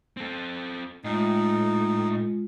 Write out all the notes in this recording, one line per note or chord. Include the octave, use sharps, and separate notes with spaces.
C4 A4
A2 G#3 D#4 F4